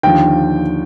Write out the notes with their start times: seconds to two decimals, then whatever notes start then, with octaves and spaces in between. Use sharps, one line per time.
0.03 D#2 D3 F3 G5